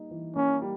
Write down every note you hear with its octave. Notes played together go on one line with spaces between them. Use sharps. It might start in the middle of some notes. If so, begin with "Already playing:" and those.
Already playing: G3 A#3 D#4
E3
A#3 C#4
G3